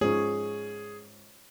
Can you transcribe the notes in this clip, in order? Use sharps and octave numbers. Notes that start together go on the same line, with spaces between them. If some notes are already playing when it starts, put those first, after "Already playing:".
G#2 F3 C#4 G#4 C#5